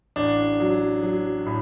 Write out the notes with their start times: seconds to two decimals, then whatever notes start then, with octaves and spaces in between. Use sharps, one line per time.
0.16 A1 D4
0.60 F#3
1.03 F#3
1.46 A2